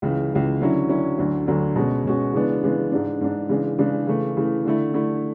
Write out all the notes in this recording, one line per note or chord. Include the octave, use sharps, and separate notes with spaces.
C#2 C#3 E3
C#2 C#3 E3
D3 F#3 C#4 E4
D3 F#3 C#4 E4
D2 D3 F#3
D2 D3 F#3
B2 G#3 C#4 F#4
B2 G#3 C#4 F#4
C#3 E3 G#3 B3 D4
C#3 E3 G#3 B3 D4
G#2 G#3 D4
G#2 G#3 D4
C#3 E3 G#3 D4
C#3 E3 G#3 D4
C#3 E3 A3
C#3 E3 A3
D3 A3 E4
D3 A3 E4